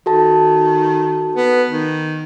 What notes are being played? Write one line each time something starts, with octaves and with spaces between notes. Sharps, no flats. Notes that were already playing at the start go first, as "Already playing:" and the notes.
D#3 F#4 A4 A5
B3
D#3